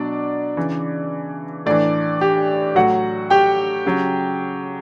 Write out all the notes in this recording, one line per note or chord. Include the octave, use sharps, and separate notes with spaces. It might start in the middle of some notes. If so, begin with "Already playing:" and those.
Already playing: B2 F#3 D4 D5
C#3 E3
A2 E3 D4 D5
G4
A2 F#3 F#4 F#5
G4 G5
C#3 F#3